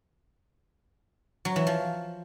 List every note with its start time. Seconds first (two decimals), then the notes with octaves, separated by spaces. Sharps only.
1.45 F#3
1.56 E3
1.67 F3